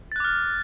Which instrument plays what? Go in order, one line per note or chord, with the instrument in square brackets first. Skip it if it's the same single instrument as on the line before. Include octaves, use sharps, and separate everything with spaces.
[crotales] A6
F#6
D6
F6